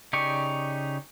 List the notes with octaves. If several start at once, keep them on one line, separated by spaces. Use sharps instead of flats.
C#3 D#4 G4 D5 C#6